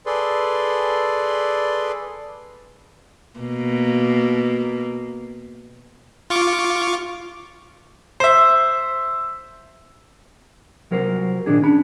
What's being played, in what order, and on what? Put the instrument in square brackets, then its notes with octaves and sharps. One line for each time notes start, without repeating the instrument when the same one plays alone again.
[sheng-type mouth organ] G#4 A4 B4 D5 C6
[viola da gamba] B2 A#3
[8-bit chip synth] F4 C#6 D6
[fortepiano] C5 E5
[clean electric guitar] C2 F#3 A#4 C5
A#2 D#3 D4 G#4
C#4 D4 B5